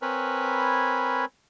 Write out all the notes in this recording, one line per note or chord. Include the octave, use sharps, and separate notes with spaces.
C4 A#4 B4 C#5 G#5 B5